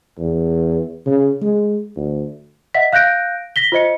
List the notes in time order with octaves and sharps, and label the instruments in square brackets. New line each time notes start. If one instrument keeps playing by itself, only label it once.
[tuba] E2
C#3
G#3
D2
[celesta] D#5 E5 F#5 B6
F5 F#6 G6 A#6 D7
A#6 B6 G7
F4 C5 D#5 C#7